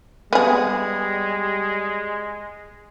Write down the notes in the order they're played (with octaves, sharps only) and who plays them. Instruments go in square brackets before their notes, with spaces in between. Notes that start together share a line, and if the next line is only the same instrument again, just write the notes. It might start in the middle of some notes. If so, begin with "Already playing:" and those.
[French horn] G3 [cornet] G#3 [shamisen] B3 G#4